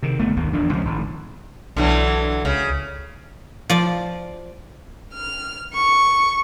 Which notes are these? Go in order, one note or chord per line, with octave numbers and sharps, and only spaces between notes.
C3 D#3
G1 A3 B3
G1 D#2 D#3 A#3
E1 A#1 E2 D4
C#2 F3 G#3 C#4
G#1 A2
B1 D3 E3 F#3
C#2 C#3
F3 D5
F6
C#6